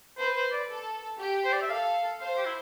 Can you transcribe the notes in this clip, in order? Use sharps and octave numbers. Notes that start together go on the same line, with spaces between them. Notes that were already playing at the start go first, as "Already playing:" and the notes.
B4 C5
C5
D5
A4
G4
C5
D5
E5
A4 F5
C5 F5
G4
E4